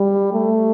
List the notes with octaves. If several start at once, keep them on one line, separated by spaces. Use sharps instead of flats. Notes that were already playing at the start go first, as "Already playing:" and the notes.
Already playing: G3
A3